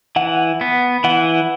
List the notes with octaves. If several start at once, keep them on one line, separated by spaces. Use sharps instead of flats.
E3 F#5
B3
E3 F#5